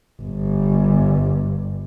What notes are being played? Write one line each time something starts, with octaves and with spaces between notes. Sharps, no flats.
G1 G2